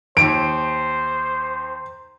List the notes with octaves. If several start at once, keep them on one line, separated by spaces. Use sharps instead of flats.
D#2 C5 D7